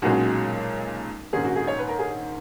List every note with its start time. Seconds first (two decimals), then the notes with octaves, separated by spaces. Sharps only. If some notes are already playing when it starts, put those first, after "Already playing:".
0.02 B1 A#2 G#3 C#4 F#4
1.33 A#1 G#2 D#3 A#3 C#4 G#4
1.44 F#4
1.56 G#4
1.67 C#5
1.79 B4
1.88 A#4
1.99 G#4